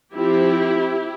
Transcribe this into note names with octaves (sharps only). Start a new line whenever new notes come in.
F3 C4 E4 G4